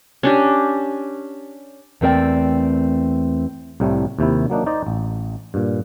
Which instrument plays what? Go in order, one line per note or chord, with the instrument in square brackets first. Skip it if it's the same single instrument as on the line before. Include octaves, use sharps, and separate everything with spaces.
[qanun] C#4 D4 G4
[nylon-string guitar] E2 A3 C4 A#4 D5 G5
[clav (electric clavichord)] C2 A2 C3 F3 G3 A3
D#2 C3 E4
F#3 A#3 D4 D#4
D#4 C5 D5 D#5
A1
G2 A#2